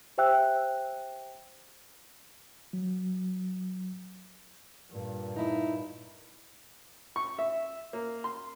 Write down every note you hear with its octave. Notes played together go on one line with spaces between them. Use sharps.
G4 C5 E5 G5 E6 F#6
F#3
G2 A#2
D#4 E4
C#6
E5
A#3
C6